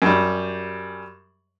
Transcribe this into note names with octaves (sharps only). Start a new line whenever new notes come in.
F#2 G3